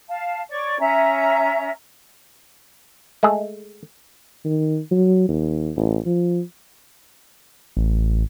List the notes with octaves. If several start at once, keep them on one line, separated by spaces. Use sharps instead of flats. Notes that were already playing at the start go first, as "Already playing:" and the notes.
F5 A5
C#5 D5 C#6
C#4 E5 A#5
G#3 A3 G#4
D#3
F#3
D#2
A1
F3
A1